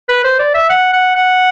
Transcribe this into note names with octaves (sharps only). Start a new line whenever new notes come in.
B4
C5
D5
E5
F#5
F#5
F#5